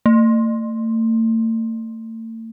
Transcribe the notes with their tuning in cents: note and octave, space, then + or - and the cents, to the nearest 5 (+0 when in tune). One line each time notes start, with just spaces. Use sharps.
A3 +40